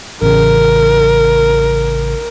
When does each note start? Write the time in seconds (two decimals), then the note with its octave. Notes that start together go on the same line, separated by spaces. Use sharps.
0.22 A1 C#3 A#4